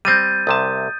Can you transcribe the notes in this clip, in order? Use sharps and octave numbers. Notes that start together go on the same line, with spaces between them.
G3 C4 G6 A6 D#7
C2 C3 A5 D#6